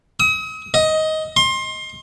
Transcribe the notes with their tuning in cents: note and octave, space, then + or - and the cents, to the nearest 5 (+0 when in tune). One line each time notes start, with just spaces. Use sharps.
D#6 +40
D#5 +15
C6 +25